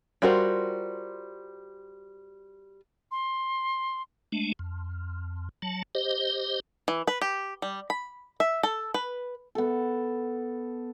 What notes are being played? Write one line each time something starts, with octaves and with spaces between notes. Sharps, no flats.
G3 F4 F#4 A#4 C5
C6
G#3 A3 D4
F2
F#3 A5
G4 C5 D#5
E3
B4
G4
G3
B5
E5
A4
B4
B3 A4